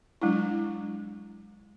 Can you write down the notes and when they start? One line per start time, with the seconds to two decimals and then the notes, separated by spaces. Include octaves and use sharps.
0.22 F#3 G#3 D4 E4